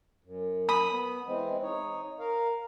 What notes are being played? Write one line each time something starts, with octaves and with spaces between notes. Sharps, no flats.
F#2
B5 D#6
B3
E3 G#3 C4
D#4 C#5
A#4 F5